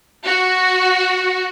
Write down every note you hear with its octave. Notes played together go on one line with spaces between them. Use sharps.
F#4